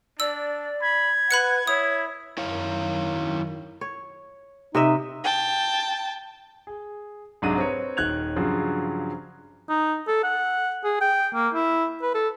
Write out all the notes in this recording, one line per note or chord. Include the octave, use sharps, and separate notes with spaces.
D4 D5 E6
B5 G#6
B4 F#5 B5 F#6 C#7
E4 C#5 D#6
F#2 D#3 E4 C#5 F5
C#5
C3 D#4 D#5 E5
G5 A5
G#4
C2 G#2 F#3 D4 F#4 D#7
C4 B4 C#5
D#1 D#3 F#6 G#6 F7
G2 C#3 F3 F#3
D#4
A4
F#5
G#4
G5
A#3
E4
B4
A4